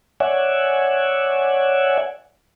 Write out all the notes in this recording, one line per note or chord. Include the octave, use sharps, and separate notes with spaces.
C#5 D5 E5 F#5 G#5